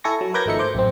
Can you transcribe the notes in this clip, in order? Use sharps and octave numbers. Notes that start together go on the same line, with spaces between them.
E4 A4 G#5 C#6 A#6
F#3
A#4 B4 D6 G6 G#6 A#6
G#1 F3 A3 D#4 E5 C#7
C5 D6 G6
A1 F#2 C4